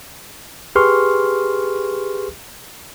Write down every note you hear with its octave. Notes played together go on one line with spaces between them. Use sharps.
G4 G#4 B4 C6 C#6 F6